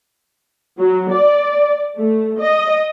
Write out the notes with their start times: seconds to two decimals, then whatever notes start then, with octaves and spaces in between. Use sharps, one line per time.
0.79 F#3
1.11 D5
1.97 A3
2.38 D#5